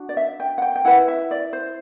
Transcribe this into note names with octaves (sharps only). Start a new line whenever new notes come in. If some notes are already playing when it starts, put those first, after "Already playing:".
Already playing: D4 F#4
D5
E5
G5
F#5
G5
G5
E4 B4 F#5
E5
D5
C5